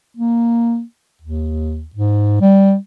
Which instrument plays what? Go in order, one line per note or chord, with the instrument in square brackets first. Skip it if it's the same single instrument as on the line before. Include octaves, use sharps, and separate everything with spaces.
[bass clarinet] A#3
D#2
G#2
G3